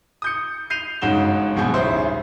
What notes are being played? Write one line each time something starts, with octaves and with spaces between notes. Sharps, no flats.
D#6 G6 C#7
G6 C7 D#7 F7
G1 G#2 C#3 F#4 E7 G7
A#1 B2 G#4 G6
D#1 C#3 E4 C5 E5